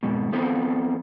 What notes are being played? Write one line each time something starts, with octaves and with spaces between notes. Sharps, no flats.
F2 G#2 B2
F3 B3 C4 F4 A4 C5